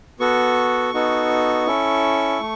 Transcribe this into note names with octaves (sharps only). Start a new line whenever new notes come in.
B3 F#4 A4 C#6
B3 D#4 F#4 A4
C#4 E4 A4
A3